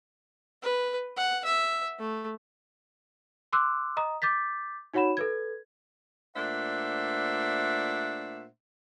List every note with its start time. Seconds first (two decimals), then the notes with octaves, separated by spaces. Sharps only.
0.62 B4
1.16 F#5
1.45 E5
1.99 A3
3.53 C6 D6 E6 F#6
3.97 D#5 A#5 D#6
4.22 D6 G6 A6 B6
4.94 D#4 F#4 C#5 F#5 B5 E7
5.17 A4 B4 G#6
6.36 A#2 A3 D4 C5 E5 F#5